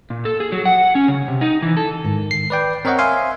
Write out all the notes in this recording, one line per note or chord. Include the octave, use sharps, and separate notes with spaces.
A#2
A4
G#4
F#3
F#5
C#4
C#3
C3
D#4
E3
A4
G#2 D#3
C7
B4 D5 G5
C4 A#4 C#5 D#5 F#5
E5 F5 G#5 C6